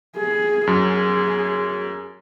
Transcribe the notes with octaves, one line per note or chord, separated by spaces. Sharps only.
G#4
F#2 G#4